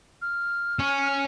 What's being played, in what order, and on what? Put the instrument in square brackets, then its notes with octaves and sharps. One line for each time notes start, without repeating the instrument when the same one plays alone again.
[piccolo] F6
[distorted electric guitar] C#4